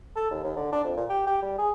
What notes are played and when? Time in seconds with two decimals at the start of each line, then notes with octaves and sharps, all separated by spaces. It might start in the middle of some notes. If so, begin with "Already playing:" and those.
0.16 A4
0.31 D#2
0.44 D#2
0.56 D3
0.72 D4
0.84 F2
0.97 A#2
1.09 G4
1.27 G4
1.42 G3
1.58 G#4